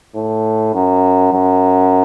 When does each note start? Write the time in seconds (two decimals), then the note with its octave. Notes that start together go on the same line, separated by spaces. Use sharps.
0.16 A2
0.75 F#2
1.33 F#2